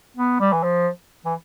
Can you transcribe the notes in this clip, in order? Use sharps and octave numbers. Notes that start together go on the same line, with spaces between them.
B3
G3
E3
F3
E3